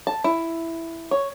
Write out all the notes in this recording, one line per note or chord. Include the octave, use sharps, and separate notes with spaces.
A5
E4
C#5